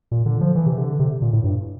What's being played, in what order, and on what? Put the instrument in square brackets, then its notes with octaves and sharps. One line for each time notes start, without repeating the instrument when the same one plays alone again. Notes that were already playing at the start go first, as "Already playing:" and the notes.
[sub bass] A#2
D3
F3
E3
C3
D3
C3
A#2
A2
G2